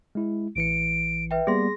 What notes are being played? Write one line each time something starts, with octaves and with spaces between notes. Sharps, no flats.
G#3 E4
A1 E3 C#7 D7
B4 E5 G5
G3 A#3 B3 G#4 C6 A#6